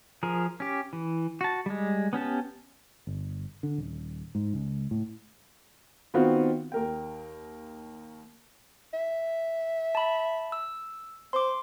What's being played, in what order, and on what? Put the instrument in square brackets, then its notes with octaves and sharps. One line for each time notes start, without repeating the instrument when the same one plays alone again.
[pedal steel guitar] F3 G#4 A#4
C#4 G4
E3
F#4 A5
G3 G#3
B3 C#4 G4 A5
[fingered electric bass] G1
D3
D#1
G#2
C#2
A2
[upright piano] D#3 B3 C4 F4 F#4
D#2 A#4 G5
[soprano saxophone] E5
[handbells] A5 B5
E6
[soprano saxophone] C5 [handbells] C6 D6